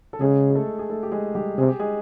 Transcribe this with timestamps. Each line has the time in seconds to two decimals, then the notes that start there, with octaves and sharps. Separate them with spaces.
0.13 A4
0.20 C#3 G#3 G#4
0.50 G#4
0.55 A3 A4
0.79 G#4
0.89 A3 A4
1.03 G4
1.12 G#3 G#4
1.35 G3 G4
1.58 C3 G#4
1.68 G4
1.79 G#3 G#4